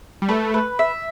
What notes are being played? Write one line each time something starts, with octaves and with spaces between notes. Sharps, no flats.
G3
A3 B4
B4
E5